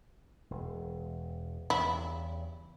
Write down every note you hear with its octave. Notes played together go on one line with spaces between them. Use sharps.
E1
E2 G2 C#3 E4